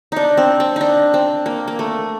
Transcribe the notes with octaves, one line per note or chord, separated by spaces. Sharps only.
D4 D#4
C4
C4
D4 D#4
C4
A#3
A#3
A3